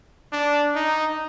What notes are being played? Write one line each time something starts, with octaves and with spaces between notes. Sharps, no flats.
D4
D#4